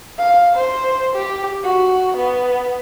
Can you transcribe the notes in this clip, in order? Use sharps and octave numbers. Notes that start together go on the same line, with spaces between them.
F5
C5
G4
F#4
B3